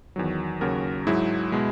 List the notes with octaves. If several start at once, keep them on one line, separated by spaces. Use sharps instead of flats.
E2 D#3 F#3
D#2 C#3 F#3 F#4 A#4
G#2 F#3 E4 G#4
B2 G#3